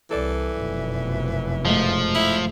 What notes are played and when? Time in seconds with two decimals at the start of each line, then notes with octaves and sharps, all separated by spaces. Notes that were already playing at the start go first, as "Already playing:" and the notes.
0.11 C2 E3 A4 D5
0.58 F1 F#2 B2
1.65 G#2 F3 A3
2.15 E4